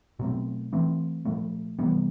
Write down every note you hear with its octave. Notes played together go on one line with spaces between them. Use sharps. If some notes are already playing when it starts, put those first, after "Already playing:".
B2 F#3 A3 C4
E3 A3 C4
A#2 F3 A3
C3 E3 G3 B3